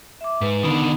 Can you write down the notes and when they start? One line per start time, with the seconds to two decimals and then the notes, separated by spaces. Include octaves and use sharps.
0.21 E5 D6
0.41 G#2 B4
0.63 D3 D#3 B3 D#4